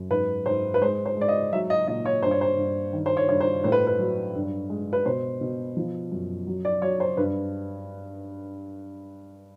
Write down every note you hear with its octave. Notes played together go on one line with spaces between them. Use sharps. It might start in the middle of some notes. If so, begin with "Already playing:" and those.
Already playing: F#2
G#2 B4
G#2 C5
B4
G#3 C5
C5
G#3 D5
D#5
F#3 E5
D#5
A#2 D#5
C#5
G2 C5
C#5
C5
G2
D#3
C5
C#5
G2 C#5
C5
A2 C5
B4
B4
F#3
G2
G#3
B4
B2 C5
B2
F3
F#2
F#3
D5
F#3 C#5
C5
G2 B4